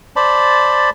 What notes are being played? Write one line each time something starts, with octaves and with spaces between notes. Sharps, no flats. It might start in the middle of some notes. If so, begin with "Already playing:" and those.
C5 D5 A5 B5